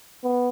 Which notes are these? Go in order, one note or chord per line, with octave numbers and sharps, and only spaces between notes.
B3